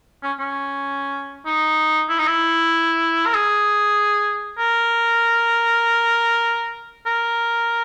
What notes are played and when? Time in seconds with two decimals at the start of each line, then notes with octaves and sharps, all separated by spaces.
0.23 C#4
0.40 C#4
1.46 D#4
2.09 E4
2.18 D#4
2.27 E4
3.26 A#4
3.34 G#4
4.59 A#4
7.06 A#4